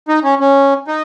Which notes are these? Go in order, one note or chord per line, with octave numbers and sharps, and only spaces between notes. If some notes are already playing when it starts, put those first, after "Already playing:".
D#4
C#4
C#4
D#4